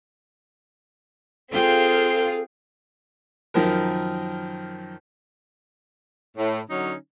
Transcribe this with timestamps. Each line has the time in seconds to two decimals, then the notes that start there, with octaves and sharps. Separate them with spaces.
1.51 C4 F4 G#4 A4 F5 G5
3.54 F#2 D#3 F3 A#4
6.37 A2
6.69 D3 F#3 C#4 D#4